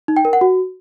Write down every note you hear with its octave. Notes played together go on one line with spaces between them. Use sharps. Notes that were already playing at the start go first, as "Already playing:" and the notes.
D#4
G5
A#4
F#5
F#4